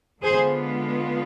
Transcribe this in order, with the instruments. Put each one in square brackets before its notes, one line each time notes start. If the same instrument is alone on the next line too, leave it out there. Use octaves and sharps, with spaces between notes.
[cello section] D3 G#3 B3 F4 G#4 C5